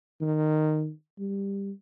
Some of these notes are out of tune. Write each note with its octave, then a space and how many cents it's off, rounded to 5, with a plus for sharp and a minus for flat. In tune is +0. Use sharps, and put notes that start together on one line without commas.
D#3 -15
G3 +15